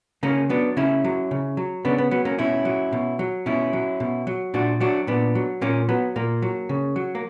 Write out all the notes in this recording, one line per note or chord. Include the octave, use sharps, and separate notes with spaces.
C#3 A#3 C#4
F#3 B3 D4
C#3 C#4 E4
F#3
C#3
F#3
C#3 B3 D4
B3
F#3 B3
A#3 C#4
B2 C#4 E4
F#3
B2
F#3
B2 C#4 E4
F#3
B2
F#3
A#2 D4 F#4
F#3 D4 F#4
A#2 B3 D4
F#3
A#2 A#3 C#4
F#3 B3
A#2 A#3
F#3
C#3
F#3
A#3